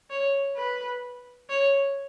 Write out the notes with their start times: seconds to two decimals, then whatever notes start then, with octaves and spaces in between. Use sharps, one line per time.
0.10 C#5
0.56 B4
1.50 C#5